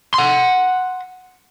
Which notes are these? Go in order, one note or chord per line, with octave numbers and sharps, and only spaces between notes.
F#5 C6